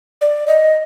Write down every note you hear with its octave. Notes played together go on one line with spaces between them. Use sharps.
D5
D#5